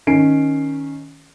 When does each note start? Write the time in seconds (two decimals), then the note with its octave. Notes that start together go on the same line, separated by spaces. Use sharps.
0.07 D#3 C#4 C7 D7